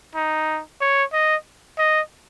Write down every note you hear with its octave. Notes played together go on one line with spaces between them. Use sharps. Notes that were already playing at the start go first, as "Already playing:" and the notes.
D#4
C#5
D#5
D#5